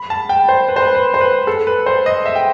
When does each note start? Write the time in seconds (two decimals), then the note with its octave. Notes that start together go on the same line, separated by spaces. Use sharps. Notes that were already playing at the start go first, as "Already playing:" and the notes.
Already playing: B5
0.10 A5
0.29 G5
0.49 C5
0.69 B4
0.76 C5
0.82 B4
0.95 B4
1.14 C5
1.21 B4
1.47 A4
1.67 B4
1.86 C5
2.06 D#5
2.26 E5
2.35 G5